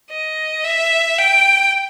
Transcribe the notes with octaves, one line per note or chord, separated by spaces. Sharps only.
D#5
E5
G5